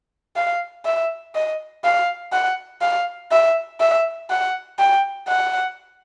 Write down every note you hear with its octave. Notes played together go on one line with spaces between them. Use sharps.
F5
E5
D#5
F5
F#5
F5
E5
E5
F#5
G5
F#5